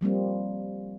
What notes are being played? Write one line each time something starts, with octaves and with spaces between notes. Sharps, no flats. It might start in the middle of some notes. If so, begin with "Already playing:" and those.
F3 G3 A#3 C4